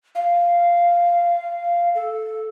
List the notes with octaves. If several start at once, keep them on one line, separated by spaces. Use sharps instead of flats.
F5
A4